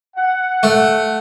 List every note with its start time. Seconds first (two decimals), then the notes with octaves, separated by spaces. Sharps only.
0.15 F#5
0.63 A3